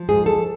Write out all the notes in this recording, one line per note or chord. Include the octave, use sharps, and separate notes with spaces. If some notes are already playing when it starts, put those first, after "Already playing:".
Already playing: F3
G#2 G#4
A4